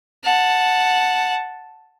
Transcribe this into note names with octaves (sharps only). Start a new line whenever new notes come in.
F#5 A5